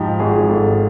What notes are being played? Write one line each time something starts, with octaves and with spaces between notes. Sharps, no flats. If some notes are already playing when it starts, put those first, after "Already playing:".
Already playing: G#2 F3 G4
G#1 G#4
G#1 A4